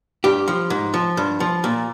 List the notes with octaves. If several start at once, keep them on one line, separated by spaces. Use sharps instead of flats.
G2 G4
F3
G#2
F3
G2
F3
A#2